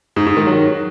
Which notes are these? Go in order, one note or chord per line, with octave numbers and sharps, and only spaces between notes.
G#2
G#2
D#3
F#3